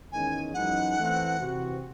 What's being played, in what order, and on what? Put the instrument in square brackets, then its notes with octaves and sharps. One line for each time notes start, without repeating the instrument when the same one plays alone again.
[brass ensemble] E2 D#3 G#3 C#4 [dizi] G#5
[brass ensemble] F#2 E3 G#3 D#4 [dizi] F#5
[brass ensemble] E3 A3 C4
C3 E3 C4 F#4